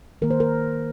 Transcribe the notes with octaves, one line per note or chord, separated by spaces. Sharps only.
D#3 A#3 A#4
C5
A#4